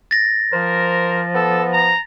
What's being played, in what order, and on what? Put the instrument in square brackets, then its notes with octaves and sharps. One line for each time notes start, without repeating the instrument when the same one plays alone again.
[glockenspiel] A6 A#6
[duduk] F3 [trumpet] A#4 [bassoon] C5
[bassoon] B3 [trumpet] A4
[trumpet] A#5